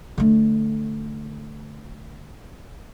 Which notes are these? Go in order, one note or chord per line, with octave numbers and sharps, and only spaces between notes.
D3 A3